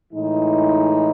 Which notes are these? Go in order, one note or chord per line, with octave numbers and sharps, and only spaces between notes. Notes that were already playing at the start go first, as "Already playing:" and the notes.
A2 E3 G#3 D#4